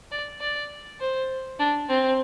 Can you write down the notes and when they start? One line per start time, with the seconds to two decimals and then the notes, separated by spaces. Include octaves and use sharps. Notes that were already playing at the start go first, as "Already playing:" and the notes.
0.12 D5
0.41 D5
1.00 C5
1.59 D4
1.89 C4